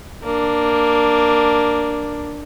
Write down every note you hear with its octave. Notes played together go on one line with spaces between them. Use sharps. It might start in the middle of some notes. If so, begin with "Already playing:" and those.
A#3 D4